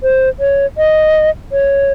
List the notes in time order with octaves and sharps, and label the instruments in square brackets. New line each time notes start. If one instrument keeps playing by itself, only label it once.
[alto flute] C5
C#5
D#5
C#5